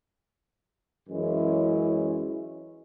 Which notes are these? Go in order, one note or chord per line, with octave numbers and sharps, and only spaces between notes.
F#2 E3 G#3 C#4 E4